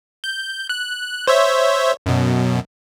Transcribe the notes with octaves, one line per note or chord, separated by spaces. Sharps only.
G6
F#6
C5 C#5 E5
F#2 B2